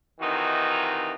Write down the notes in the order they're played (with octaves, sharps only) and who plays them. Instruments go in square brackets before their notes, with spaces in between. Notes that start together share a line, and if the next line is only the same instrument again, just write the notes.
[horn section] C3 D#3 E3 D#4 F4 F#4